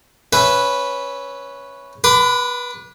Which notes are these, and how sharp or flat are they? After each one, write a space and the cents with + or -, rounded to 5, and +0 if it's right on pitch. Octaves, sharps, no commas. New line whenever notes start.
C#4 +0 B4 -5 E5 +0
B4 -25 B5 +30 D6 +0